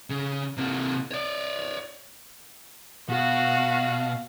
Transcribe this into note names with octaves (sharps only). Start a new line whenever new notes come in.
C#3
C3 A#3
C#5 D5
B2 F#4 F5